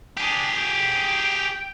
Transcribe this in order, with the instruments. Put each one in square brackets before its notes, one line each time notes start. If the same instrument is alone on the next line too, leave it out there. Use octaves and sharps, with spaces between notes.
[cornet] D4 [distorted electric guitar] G4 G#4
[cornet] G5